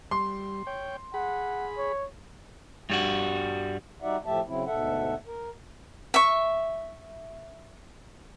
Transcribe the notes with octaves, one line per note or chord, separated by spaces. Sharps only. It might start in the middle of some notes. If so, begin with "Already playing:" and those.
G3 C6
C#5 G5
G#4 F#5 B5
C#5
G2 G3 F#4
G3 D#4 F#4 D5 E5 F#5
A2 F3 A3 G4 E5 A5
C#3 F#3 C4 E4
D2 G#2 B2 A4 E5 F#5
A#4
E5 C#6